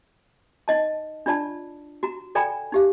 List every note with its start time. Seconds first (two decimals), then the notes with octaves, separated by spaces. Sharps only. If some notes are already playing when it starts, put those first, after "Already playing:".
0.68 D#4 D#5 A5
1.26 D4 F4 D5 A5
2.03 F#4 A#5
2.35 A4 D5 G5 G#5 A#5 B5
2.72 D#4 G4 F5